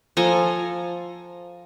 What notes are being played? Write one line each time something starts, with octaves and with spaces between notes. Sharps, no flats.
F3 A4 G#5 A#5